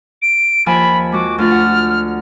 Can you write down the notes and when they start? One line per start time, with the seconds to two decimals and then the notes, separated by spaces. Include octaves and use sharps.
0.22 D7
0.66 D#2 F3 G#5 B5
1.12 G#3 F#4 D6
1.38 D2 F4 D5 F6
1.51 F#5